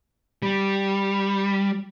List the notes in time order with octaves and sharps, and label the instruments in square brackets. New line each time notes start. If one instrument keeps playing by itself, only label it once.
[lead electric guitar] G3